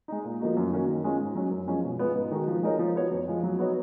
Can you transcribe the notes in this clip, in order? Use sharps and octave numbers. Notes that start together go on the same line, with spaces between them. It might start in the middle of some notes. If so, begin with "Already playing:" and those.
G#3 D#4
A#2
F3 A#3 D#4 F#4
F#2
D#3 A#3 C#4 F#4
D#3
G#3 C#4 F4
G#2
F#3 C#4
F#2
F3 G#3 C#4
B2
G#3 B3 F4 B4
G#2
D#3 G#3 D#4 F#4
F3
G#3 D#4 A#4 C#5
F3
B3 F#4 C#5
F2
F3 G#3
F#3
B3 D#4 F#4 C#5